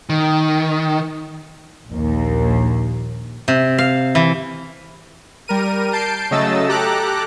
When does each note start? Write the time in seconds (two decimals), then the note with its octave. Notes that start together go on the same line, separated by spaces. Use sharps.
0.09 D#3
1.88 A#1 D#2
3.48 C3
3.78 F5
4.15 E3
5.48 G3 A#4 D#7
5.93 A5 G6 C7 D7
6.31 C#3 F#3 A3 D#5 E6 A6
6.68 G4 A4 A#5 D6 F#6